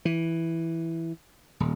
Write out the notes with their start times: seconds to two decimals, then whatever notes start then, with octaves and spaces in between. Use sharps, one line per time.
0.05 E3
1.60 D#1